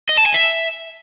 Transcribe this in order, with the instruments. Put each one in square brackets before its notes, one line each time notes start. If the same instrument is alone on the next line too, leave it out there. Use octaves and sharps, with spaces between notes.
[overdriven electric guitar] D#5
A5
G#5
E5